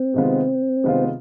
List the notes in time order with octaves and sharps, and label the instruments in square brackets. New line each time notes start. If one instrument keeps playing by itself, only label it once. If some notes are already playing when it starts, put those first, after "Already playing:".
Already playing: [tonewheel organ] C4
[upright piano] C3 D#3 G#3 B3 F4
C3 D#3 G#3 B3 F4